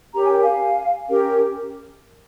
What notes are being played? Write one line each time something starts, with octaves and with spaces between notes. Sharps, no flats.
C#4 G4 A#4 C#5 A#5
G#5
G5
F5 G#5
C#4 G4 A#4 C#5